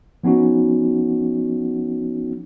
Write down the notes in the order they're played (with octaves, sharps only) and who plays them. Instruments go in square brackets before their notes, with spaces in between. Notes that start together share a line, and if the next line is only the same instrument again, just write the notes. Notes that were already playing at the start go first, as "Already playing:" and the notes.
[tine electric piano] F3 B3 C#4 D#4 F#4